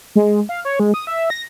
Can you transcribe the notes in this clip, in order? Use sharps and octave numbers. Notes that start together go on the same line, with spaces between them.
G#3
F5
C#5
G#3
D#6
E5
A#6